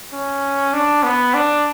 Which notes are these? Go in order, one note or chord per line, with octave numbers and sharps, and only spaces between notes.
C#4
D4
B3
D4